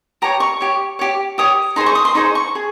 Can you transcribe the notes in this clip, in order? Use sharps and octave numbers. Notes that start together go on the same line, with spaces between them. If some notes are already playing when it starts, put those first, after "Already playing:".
G4 C#5 A#5
C#6
G4 C#5
G4 C#5
G4 C#5 D#6
D#4 G#4 C5 C6
C#6
D#6
C6
D#4 G#4 C5 C#6
C#6
G#4